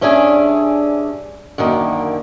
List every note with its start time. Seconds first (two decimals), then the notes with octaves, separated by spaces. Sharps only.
0.01 G2 C#4 D4 G#4 E5 G#5
1.58 F#2 D3 D#3 A#3